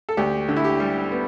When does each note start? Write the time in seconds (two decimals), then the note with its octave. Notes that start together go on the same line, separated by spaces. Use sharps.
0.09 A4
0.17 D2 G4
0.48 D3
0.56 E4
0.64 G4
0.80 G3
1.11 B3